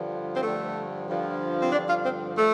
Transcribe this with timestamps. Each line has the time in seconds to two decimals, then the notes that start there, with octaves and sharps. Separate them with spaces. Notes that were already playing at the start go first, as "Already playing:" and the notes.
Already playing: G2 D3 F3
0.35 C4
0.43 G2 D3 F3 A3
1.07 G2 D3 F3
1.62 C4
1.72 G2 D3 F3 D4
1.90 F4
2.05 C4
2.37 F3 A3